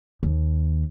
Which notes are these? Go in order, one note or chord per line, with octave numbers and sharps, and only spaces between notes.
D#2